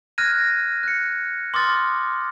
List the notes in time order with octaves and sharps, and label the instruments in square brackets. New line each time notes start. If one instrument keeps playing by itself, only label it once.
[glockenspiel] F6 F#6 G#6 A#6 D#7
F#6 C#7
C6 D6 D#6 F6 A6